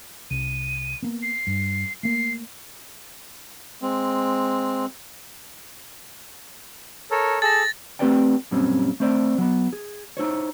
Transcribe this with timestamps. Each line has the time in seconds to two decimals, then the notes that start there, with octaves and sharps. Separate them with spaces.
0.31 C2 D#7
1.02 A#3 B3
1.22 C7
1.47 G2
2.03 A3 A#3 C7
3.82 G#3 C4
7.11 A4 A#4 C#5
7.42 G#4 A4 A5 A6 A#6
7.99 A3 C4 G4 B4 D5 G5
8.51 F#2 A#2 G3 C4 C#4
9.00 A3 C4 C5 D5
9.38 F#3 B3
9.73 G#4
10.17 D#4 E4 C5 C#5